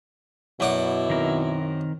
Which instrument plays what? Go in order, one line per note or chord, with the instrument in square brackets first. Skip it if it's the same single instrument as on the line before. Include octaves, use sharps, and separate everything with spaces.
[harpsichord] F#2 D5 F#5 [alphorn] B2 [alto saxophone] E4
[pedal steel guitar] D#3 C4 A#4